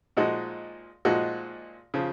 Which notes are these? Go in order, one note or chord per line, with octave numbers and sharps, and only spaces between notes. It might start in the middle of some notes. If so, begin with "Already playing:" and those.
A#2 F3 G#3 D#4 F#4
A#2 F3 G#3 D#4 F#4
C#3 F3